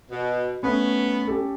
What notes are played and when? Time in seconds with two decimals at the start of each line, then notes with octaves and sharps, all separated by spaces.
0.10 B2
0.63 A3 B3 C#4
1.27 C#4 G4 A4